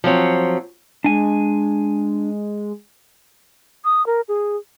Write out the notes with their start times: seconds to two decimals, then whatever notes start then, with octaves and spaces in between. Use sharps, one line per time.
0.04 F3 F#3 C4 C#5
1.04 G#3 D4 G#5
3.85 D#6
4.06 A#4
4.28 G#4